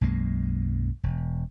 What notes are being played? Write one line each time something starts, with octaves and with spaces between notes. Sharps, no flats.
B1 F#2 G#3 A#3
E1